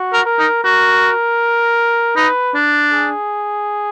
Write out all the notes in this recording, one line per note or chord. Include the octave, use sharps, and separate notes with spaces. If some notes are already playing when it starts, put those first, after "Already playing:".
Already playing: F#4
A#4
A#4
D#4
F#4 A#4
D#4 B4
D4
G#4